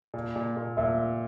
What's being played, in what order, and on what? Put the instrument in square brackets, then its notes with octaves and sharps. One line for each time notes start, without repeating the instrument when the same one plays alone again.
[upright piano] A#2
A#2
A#2
[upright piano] A#2 [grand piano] E5